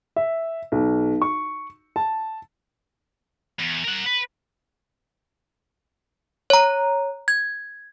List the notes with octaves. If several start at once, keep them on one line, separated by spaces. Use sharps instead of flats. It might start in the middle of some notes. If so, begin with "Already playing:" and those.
E5
B1
C#6
A5
E2
A#4 F#5
B4
C#5 A#5
G#6